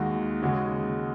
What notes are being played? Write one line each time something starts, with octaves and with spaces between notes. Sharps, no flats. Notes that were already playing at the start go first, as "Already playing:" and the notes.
Already playing: D#2 D#3 G#3 F#4
D#2 C#3 G#3 F#4